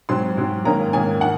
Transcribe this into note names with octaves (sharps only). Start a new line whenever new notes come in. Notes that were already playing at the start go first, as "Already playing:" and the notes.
G#2 F#3 C4 C6
G#2 F#3 C4
G#2 D#3 A#3 C#4 A#5
G#2 D#3 A#3 C#4 G#5
D#3 F#5